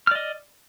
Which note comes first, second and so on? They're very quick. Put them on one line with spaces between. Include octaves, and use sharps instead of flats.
F6 D5 D#5